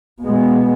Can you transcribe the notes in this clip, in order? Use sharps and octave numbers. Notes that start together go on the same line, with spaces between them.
B2 G#3 B3